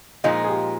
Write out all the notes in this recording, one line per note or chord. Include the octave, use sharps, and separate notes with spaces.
A#2 F3 G#3 D#4 D#5
G#4
G4